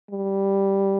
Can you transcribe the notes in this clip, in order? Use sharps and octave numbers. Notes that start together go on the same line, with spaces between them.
G3